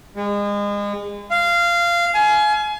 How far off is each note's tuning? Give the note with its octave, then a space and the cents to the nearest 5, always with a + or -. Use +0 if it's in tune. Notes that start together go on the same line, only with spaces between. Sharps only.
G#3 -30
F5 -15
G#5 +30